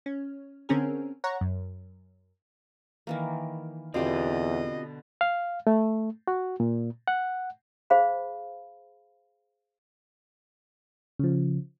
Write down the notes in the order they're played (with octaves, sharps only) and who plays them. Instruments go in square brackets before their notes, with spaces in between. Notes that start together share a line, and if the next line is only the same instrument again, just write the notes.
[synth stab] C#4
D3 C4 C#4 G#4 A#4
C#5 F#5 A#5
F#2
[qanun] D#3 E3 A#3
[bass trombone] E2 [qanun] B2 D3 B3 [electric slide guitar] C4 F4 G4 [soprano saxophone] D#5
[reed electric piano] F5
A3
F#4
A#2
F#5
[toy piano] G#4 C5 F5 B5
[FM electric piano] C#3 F3